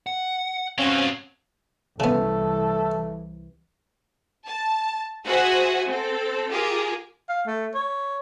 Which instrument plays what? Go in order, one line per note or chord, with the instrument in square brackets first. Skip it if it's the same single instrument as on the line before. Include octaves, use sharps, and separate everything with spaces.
[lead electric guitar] F#5
[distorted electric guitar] G2 F#3 [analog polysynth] C4 C#4 [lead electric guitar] F5
[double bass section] C2 E3 [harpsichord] C#3 B3 [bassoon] A3 [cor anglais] A4
[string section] A5
F#4 G#4 C5 E5 F#5 G#5
C4 A4
F4 G4 G#4 A#4
[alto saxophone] F5
A3
C#5